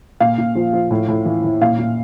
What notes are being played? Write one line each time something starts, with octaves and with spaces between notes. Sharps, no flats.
A#2 F5
A#2
F3
F3
A2
A2
E3
E3
A#2 F5
A#2